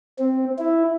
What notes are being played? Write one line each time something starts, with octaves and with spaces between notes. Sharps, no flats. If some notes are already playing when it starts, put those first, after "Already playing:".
C4
E4